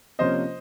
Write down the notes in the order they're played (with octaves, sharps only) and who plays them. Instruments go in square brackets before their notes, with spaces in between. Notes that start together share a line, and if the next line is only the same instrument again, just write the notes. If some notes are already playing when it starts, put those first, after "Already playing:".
[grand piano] C3 F3 A#3 C#4 F4 [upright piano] C5 D#5